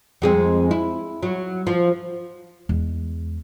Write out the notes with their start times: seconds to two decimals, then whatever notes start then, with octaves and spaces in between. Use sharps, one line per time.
0.22 F2 G#3 C4
0.71 E4
1.23 F#3
1.67 F3
2.69 E2 G#3